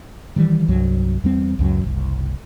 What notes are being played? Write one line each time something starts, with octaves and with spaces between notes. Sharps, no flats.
D#3 E3 G3
C2 G2 F#3
E2 G3 C4
C#2 F#2 F#3
F#1 C2